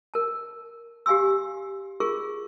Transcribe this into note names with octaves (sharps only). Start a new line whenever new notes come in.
A#4 A5
G4 F5 G#5 C6 E6
F4 G#4 A#4 C#6